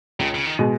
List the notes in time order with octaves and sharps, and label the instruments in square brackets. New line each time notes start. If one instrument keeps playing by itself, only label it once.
[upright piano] C#2 [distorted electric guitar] C#3
[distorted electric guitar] C#3
D#3
[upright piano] B2 G#3